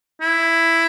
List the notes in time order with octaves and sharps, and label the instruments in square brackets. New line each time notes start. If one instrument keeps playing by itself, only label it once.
[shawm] E4